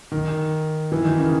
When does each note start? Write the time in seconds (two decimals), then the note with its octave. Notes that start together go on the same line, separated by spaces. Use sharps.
0.12 D#3
0.92 E3
1.04 D#3
1.18 C#3